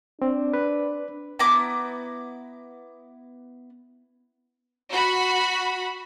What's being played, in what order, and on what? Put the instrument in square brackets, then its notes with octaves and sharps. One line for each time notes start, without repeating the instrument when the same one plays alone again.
[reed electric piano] C4 [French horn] D4
[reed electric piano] B4
[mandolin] B3 E4 A#5 D6
[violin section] F#4 B5